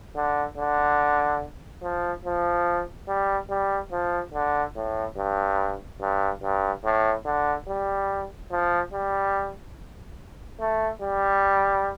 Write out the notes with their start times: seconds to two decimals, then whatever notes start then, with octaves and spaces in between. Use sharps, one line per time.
0.16 D3
0.57 D3
1.83 F3
2.25 F3
3.08 G3
3.50 G3
3.92 F3
4.34 D3
4.76 A2
5.17 G2
6.01 G2
6.42 G2
6.84 A2
7.26 D3
7.68 G3
8.52 F3
8.94 G3
10.60 A3
11.02 G3